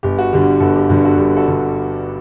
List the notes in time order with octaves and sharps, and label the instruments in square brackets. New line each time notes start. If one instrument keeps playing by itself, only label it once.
[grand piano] G1 G4
F#4
G2 D3 G3 G4
G1 F#4 A4
G4
G2 D3 G3 F#4
F#4 A4
G1 G4
F#4 A4
G2 D3 G3